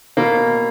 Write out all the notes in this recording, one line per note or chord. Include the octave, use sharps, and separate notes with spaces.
B2 A#3